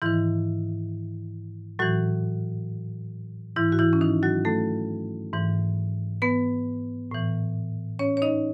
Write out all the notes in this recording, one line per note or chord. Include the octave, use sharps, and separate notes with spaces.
G#2 D#3 E3 E4
A2 E3 F#3 F#4
G#2 E3 E4
F#4
E3 E4
C#4
D#3 D#4
F#3 F#4
A3 A4
G#2 E3
B3 B4
A2 E3
C#4 C#5
C#5
D#4 D#5